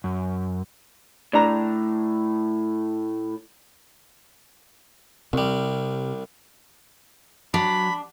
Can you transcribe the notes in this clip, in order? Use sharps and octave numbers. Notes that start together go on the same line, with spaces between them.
F#2
A2 D4 A#5
C2 C3 G3
F#3 D4 B5